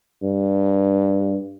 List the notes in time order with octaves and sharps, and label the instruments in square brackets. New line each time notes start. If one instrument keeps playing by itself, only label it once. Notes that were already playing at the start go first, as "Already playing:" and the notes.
[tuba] G2